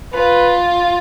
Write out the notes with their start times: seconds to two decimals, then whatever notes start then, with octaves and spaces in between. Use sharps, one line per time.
0.13 F4 B4